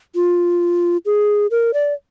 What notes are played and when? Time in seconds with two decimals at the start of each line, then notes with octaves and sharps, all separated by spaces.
0.15 F4
1.06 G#4
1.51 A#4
1.74 D5